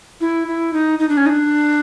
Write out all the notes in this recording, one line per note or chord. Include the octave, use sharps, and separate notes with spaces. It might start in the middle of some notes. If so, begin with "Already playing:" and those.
E4
E4
D#4
D#4
D4
C#4
D#4
D4